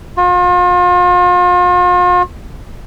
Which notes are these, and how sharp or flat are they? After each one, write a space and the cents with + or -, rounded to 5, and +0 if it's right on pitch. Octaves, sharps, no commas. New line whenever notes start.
F4 +40